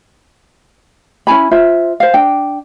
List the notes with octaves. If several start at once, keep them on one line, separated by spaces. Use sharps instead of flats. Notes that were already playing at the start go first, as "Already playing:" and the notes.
C#4 E4 G#5 B5
F4 C5 E5
C5 F5
D4 G5